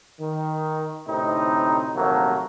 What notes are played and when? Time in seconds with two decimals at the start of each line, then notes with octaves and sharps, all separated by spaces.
0.20 D#3
1.07 D2 A2 C3 C4 D#4
1.94 A#1 D#2 C3 F#3 A3 A#3